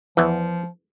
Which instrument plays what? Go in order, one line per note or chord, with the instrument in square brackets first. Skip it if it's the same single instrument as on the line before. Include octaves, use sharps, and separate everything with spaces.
[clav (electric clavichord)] E2 E3 [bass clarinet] F3